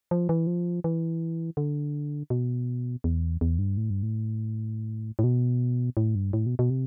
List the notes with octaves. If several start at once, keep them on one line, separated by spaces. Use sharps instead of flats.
F3
E3
F3
E3
D3
B2
E2
E2
G2
A2
G2
A2
A2
B2
A2
G2
A2
B2
B2
C3